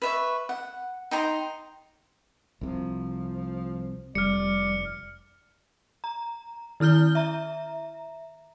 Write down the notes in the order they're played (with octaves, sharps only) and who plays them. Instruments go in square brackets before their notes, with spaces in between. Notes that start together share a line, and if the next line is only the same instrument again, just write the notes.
[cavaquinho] B4 E5 C#6
F#5
D#4 G5 A#5 C6
[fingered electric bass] C2 C3 [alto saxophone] F3
[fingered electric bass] F1 [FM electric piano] G3 [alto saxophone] D5 [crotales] F6 C#7
[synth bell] A#5
D#3 E4 F6 G6 G7
E5 A#5